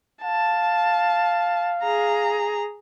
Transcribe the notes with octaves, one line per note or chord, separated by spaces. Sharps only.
F5 A5
G#4 A#5